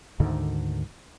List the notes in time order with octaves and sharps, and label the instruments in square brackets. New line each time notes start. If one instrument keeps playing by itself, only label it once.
[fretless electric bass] D2 G#2 D3 D#3